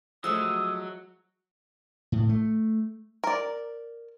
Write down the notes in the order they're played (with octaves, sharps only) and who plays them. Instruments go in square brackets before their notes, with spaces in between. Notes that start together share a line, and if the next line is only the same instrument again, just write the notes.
[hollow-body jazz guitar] F3 G#3 A3 [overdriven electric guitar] F#3 [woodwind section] D#6 [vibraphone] E6
[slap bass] A2
A3
[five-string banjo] A#4 D5